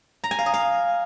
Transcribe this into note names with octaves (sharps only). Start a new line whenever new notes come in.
A#5
G#5
F5
D#5
F5